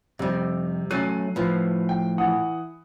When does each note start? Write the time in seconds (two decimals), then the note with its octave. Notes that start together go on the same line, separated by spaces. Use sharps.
0.19 F2 C3 G3
0.91 F#3 A3 C#4 F#6 C7 D#7
1.36 A2 F3 B4
1.89 G5
2.18 E3 F#5 D#6